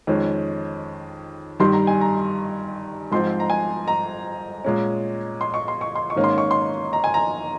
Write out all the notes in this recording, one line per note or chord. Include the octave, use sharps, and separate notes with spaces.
F2 D#3 G#3 C#4
G2 D#3 G3 C6
A#5
G#5
A#5
G#2 F3 C4 C6
A#5
G#5
A#5
A#2 G#3 C#4
C6
C#6
C6
C#6
C6
C#6
G#2 D#3 A#3 C#4
C6
C#6
C6
A#5
G#5
A#5